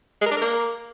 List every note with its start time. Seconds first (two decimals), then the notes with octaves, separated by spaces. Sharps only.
0.21 G#3
0.26 A#4
0.31 D4
0.36 A#4
0.41 A#3